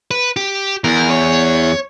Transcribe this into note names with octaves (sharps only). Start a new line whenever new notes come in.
B4
G4
E2 A#4
C#5